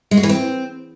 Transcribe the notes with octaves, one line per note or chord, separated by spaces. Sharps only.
G#3
F#4
E3
C4